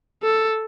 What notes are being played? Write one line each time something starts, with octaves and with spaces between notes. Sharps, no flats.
A4